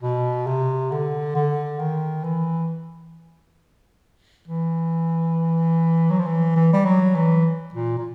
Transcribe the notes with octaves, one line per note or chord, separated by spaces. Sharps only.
B2
C3
D3
D3
D#3
E3
E3
F#3
F3
E3
E3
G3
F#3
E3
A#2
A#2